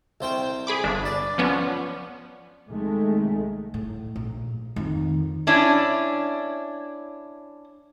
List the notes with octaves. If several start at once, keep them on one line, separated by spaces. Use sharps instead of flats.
C2 C5 G5
G#4 B5 D6
G1 D4
D5
F3 B3 C#4
C2 D#3 G#3 A3
A2
A#1
F2 D#3
C#4 D4 E4